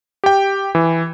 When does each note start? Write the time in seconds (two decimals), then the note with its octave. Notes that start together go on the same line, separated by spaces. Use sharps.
0.24 G4 G5
0.75 E3